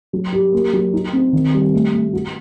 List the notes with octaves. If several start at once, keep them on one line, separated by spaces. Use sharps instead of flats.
F#3
G4
A#3
F#3
D#4
C4
D#3
G3
A3
A3
F#4